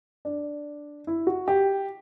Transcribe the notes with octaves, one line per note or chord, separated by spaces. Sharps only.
D4
E4
F#4
G4